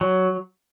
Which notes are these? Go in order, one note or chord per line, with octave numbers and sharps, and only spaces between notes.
F#3